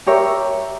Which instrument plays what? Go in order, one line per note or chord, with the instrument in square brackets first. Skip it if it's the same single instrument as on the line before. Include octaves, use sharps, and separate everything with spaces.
[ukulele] G4 A#4 C#5 E5